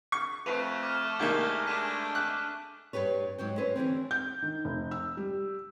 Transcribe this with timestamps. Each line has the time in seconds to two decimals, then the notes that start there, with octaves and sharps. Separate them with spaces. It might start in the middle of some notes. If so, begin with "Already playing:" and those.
0.12 C#6
0.46 F2 A3 B4 C#6 D#7 F7
0.83 D6 F6 D#7
1.19 C2 D#3 G#3 A#3 D6 G6 G7
1.67 A3 D4 B6 D#7 E7
2.15 F#6
2.93 G2 D#3 G4 B4 C#5
3.38 G#2 F#3 F#4 G5
3.57 C#4 B4 C5
3.76 D3 E3 G3 C4
4.11 G6
4.42 D#3
4.65 F1
4.91 E6
5.17 G3